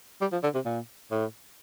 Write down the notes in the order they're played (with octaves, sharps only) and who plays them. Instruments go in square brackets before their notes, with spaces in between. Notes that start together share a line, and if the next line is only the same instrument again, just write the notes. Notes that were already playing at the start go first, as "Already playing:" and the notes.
[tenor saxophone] G3
F3
D3
C3
A#2
A2